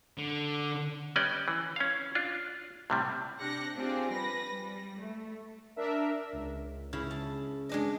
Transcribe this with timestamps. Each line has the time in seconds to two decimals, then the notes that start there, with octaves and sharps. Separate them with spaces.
0.18 D3
1.16 G3 B3 C#4 D5 D#5
1.48 E3
1.76 C#4 F5
2.15 D4 F4
2.90 A2 C3 G3
3.39 C3 D4 G4 F#6 A#6 C#7
3.76 C4 D4 F4 G4 G#4 D5
4.12 G3 B4 A#6
4.52 G3
4.99 A3
5.76 D4 A#4 E5
6.33 C#2
6.93 C#3 E4
7.11 A5
7.69 G#3 D4 D#5